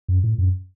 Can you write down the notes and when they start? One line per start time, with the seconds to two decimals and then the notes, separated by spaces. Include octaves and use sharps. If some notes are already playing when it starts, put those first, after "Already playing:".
0.08 F#2
0.24 A2
0.38 F#2